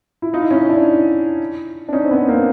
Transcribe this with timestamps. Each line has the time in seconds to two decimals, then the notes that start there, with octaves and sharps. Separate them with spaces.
0.22 E4
0.33 D#4 F4
0.43 E4
0.51 C#4 D#4
0.69 D4 E4
1.89 D4
1.93 C#4 D#4
2.04 C4
2.11 B3 C#4
2.28 A#3 C4